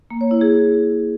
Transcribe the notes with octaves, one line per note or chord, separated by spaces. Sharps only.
A#3
C#5
E4
G#4